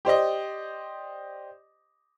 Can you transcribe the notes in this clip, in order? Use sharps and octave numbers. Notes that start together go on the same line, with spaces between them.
G4 C5 D5 D#5